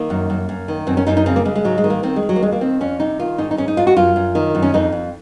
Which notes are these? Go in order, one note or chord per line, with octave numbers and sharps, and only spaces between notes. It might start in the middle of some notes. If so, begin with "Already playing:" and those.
Already playing: D#3 A#3
F#2
F#2
F#2
D#3
F#2 C4
C#4
F#2 D#4
D#4
C#3 C4
A#3
C#3 G#3
G#3
G#2 F#3
G#3
D#3
A#3
D#3 C4
G#3
D#3
F#3
A#3
F2 G#3
A#3
D#3 C4
F2 C#4
C3 D#4
D#3 F4
G#2 D#4
D#4
G#2 C#4
D#4
G#2 F4
F#4
F#2 F4
F#2
D#3
F#2
C#4
F2 D#4
F2